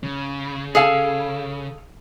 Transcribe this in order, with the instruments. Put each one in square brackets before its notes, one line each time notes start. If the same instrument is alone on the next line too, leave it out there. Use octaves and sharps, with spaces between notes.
[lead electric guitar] C#3
[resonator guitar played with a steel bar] G#4 A4 F5